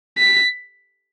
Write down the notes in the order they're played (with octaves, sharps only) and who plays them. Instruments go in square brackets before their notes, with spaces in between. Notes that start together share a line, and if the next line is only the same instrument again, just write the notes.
[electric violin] B6